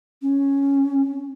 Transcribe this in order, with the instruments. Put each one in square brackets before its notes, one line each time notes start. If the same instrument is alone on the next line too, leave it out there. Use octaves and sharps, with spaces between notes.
[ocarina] C#4